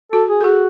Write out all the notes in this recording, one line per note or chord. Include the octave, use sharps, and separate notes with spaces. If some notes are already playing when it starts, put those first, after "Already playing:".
F#4 A4
G#4
A4
F#4 G#4